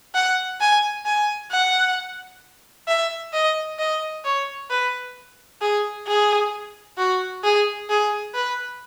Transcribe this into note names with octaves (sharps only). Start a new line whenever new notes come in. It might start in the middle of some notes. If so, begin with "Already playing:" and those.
F#5
G#5
G#5
F#5
E5
D#5
D#5
C#5
B4
G#4
G#4
F#4
G#4
G#4
B4